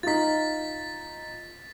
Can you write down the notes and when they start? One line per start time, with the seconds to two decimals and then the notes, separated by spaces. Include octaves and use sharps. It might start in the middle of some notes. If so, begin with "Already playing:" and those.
0.03 D#4 F4 A6 B6